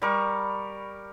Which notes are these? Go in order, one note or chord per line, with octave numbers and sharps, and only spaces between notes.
G3 A#4 C#6